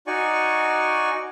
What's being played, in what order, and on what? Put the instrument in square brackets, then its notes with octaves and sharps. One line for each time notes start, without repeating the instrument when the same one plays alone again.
[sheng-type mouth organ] D#4 F#4 D5 G#5 C#6